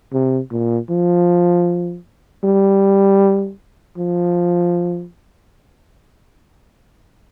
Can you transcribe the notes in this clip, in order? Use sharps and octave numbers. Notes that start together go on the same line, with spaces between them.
C3
A#2
F3
G3
F3